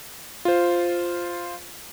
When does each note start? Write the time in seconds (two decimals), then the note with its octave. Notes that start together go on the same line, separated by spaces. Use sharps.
0.45 F4 C5